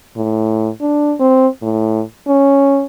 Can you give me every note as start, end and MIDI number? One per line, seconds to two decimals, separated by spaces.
0.17 0.69 45
0.81 1.15 62
1.20 1.48 60
1.62 2.02 45
2.28 2.86 61